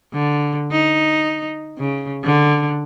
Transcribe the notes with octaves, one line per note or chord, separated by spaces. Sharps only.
D3
D#4
C#3
D3